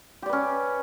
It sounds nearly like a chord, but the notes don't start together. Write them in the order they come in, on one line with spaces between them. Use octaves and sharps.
G4 D5 B4 C#4